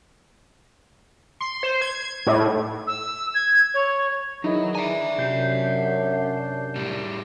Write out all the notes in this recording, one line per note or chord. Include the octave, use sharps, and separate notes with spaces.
C6
C5
G#6
A2
E6
G#6
C#5
D#3 E3 F#3 D#4 E4 G#4
D4 E5 G#5 A#5
F#2 C3 G6 C7
A2 G3